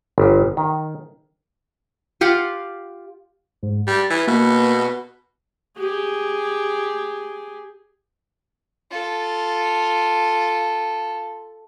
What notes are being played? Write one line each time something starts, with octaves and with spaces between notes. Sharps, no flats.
G1
D#3
F4 G4 F5 F#5
G#2
G3 A6
E3
B2 A#3
G4 G#4
F4 A4